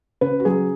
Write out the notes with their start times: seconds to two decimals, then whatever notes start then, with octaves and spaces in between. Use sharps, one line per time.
0.21 C#3 B4
0.40 F#4
0.45 F#3 G#4